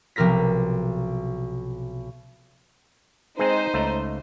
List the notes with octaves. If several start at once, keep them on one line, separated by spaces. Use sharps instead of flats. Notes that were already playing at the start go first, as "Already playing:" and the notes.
B1 C3 F3 A#4 A#6 B6
G#3 C4 D#4 G#4 C5 D#5
C#2 A3